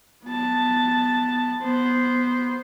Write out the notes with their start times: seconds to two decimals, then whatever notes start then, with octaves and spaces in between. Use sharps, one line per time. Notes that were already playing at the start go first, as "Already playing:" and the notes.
0.25 B3 A5
1.62 B3 C5